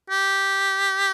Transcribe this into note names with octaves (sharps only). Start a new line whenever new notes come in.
G4